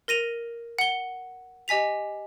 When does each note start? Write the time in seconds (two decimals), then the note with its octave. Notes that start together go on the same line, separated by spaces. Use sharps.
0.08 A#4 A#6 D#7 F7
0.79 F#5 G7
1.68 G4 D#5 G#5 B6 F7